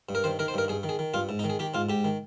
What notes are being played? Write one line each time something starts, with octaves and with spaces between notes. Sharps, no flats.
G2
A#4
D#3 C5
D#3 A#4
C5
G2 A#4
G2 G#4
D#3
G#4
D#3
G2 F4
G#2
D#4
D#3
G#4
D#3 G4
G#2 F4
G#2 G4
D#3